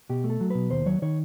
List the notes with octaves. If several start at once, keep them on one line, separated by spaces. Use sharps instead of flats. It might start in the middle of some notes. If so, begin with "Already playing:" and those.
B2 G4
A3
A4
F#3
B2 B4
D#2 C5
F#3 C#5
D#3 C#5